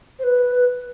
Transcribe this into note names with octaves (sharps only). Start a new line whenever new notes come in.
C5
B4